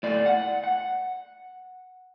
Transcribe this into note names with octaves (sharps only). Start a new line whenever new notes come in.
A2 D5
F#5
F#5